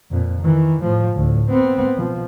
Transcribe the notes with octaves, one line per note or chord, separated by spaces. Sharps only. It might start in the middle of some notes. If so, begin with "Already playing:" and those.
F2 A#2
D#3 E3
A2 F3
D2 A2
B3 C4
B2 F3